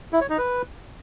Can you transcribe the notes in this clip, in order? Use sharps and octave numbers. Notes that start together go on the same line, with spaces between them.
E4
C#5
D#4
B4